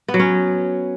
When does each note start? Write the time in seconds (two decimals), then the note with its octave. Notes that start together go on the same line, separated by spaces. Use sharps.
0.08 B3
0.14 F#3
0.19 C#4